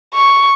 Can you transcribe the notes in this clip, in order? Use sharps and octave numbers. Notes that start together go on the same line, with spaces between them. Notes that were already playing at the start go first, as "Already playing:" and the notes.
C#6